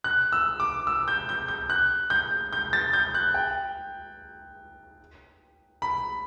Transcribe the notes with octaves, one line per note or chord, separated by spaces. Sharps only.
F#6
E6
D6
E6
G6
G6
G6
F#6
G6
G6
A6
G6
F#6
G5
B5